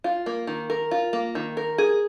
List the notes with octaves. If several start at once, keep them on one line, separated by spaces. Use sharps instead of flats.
F4
A#3
D#3
A#4
F4
A#3
D#3
A#4
G#4